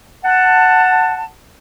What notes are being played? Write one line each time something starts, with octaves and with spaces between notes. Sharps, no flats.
F#5 A5